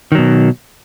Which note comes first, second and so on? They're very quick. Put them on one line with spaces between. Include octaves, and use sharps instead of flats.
D#3 F#3 B2